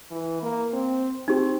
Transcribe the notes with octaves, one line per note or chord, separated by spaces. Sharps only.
E3
A#3
C4
C4 D#4 G4